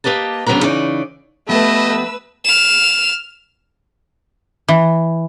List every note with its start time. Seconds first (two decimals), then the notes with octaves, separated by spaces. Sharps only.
0.04 A#3 G4 B4 D#5 A5
0.46 D2 C#3 F#3 B3 D4 A#5
0.63 C#3 E3 D#4 C#5 D5
1.49 F3 A3 B3 G4 B4 D#5 E6
2.45 F6 E7
4.68 E3